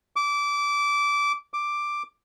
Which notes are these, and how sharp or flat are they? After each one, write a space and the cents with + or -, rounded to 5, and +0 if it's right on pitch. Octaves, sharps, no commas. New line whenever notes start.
D6 -20
D6 +5